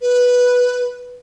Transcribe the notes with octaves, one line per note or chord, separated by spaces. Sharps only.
B4